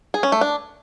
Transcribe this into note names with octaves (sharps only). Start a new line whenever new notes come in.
G#4
C#4
A3
D4